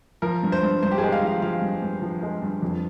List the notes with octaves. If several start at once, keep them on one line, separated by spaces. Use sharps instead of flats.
F3 A#4
G2
C5
G2
G2 C5
G4
G#3 G#4
F5
F3 F5
F3 F5
G2
G2
F3
G#3
G2
F2